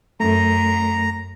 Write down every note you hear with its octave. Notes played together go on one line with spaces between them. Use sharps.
F#2 A3 A#5